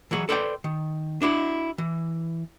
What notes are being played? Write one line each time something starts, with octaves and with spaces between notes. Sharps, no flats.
E3 F#3 F#4 G#4
A4 B4 C5 D5 F#5 G5
D#3
D4 E4 F#4
E3